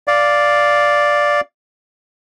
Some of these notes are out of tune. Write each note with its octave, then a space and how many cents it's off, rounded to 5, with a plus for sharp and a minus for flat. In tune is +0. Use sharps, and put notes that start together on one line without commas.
D5 +0 F5 +0